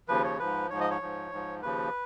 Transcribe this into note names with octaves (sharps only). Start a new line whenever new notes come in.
D#2 C#3 F3 B4
C#5
G#2 F3 B4
G#2 F3 C#5
D#5
C#5
G#2 F3
G#2 F3
D#2 C#3 F3 B4